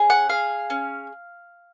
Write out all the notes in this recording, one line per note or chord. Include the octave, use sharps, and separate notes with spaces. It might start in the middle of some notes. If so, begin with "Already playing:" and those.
Already playing: C#4 G#4
F#5
G#4 F5
C#4